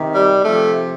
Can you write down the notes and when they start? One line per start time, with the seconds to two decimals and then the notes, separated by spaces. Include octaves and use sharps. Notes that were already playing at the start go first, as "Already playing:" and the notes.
Already playing: C3 D#3
0.13 G3
0.44 C3 F3 A3